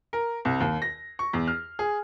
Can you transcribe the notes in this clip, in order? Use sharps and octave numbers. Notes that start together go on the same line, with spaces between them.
A#4
C2
D#2
A#6
C#6
E2
F6
G#4